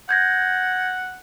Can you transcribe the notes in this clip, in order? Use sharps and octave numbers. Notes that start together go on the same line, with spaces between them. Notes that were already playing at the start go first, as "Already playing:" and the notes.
F#5 G6 G#6 A#6